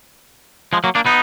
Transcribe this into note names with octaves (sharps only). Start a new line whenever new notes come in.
F3 G#3
F#3 A#3
A#3 D4
B3 D#4